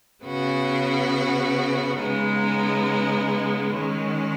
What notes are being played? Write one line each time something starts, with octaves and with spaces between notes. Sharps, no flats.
C#3 B3 F#4
C#3 G#3 B3 D#4
D#3 G#3 C#4